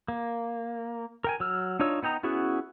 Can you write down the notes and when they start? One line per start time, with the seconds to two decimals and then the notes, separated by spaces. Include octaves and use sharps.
0.08 A#3
1.24 A#4 G5 G#5
1.40 F#3 E6 F6
1.79 D4 D#4 F4 C#5 E6
2.03 B3 D#4 G5 A#5
2.23 B3 C#4 E4 F#4 G#4